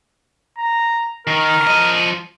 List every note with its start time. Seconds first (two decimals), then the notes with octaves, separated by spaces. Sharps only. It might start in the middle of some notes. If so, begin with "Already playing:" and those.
0.58 A#5
1.27 D#3 A#4
1.67 F3 D#5